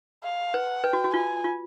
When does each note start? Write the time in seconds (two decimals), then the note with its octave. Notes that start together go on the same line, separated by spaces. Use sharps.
0.23 F5
0.53 B4 F#5
0.84 B4 G5
0.93 F#4
1.04 F#4
1.14 F4 G#5
1.44 F4